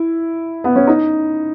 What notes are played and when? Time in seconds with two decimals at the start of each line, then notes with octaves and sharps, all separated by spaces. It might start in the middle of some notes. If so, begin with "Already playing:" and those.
Already playing: E4
0.64 B3
0.76 C#4
0.87 D#4